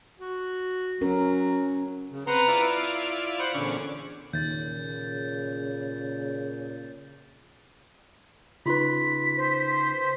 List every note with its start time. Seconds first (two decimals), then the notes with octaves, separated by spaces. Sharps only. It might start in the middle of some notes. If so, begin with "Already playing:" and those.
0.20 F#4
1.01 F#3 C#4 A#4
2.11 C#3
2.27 C4 B4 F#5 A#5
2.48 E4 F4 D5
2.74 F5
3.39 C5 F#5 B5
3.54 E2 A#2 D3 C#4 D4
4.33 D#2 A#2 C#3 G6 A6
8.66 C#3 D#4 F4 B4 C6 C#6 B6
9.38 C5